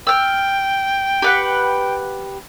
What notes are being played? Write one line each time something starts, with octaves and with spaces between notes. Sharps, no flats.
G5 E6 F6
G4 B4 F#5